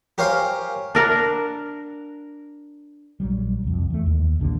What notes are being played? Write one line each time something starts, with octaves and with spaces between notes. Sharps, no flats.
G4 A#4 C5 C#5 F5 G#5
D4 A#4 F#5
A#1 F#3 G3
C2 F2
E2 A3
D#2
A#1 D3 G#3 A#3